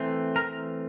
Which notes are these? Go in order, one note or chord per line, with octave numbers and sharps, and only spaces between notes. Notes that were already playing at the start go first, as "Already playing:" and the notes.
Already playing: E3 A3 C4
A#4